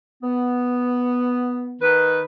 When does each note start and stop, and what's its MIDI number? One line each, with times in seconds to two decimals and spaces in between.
0.23 1.85 59
1.81 2.21 51
1.81 2.21 71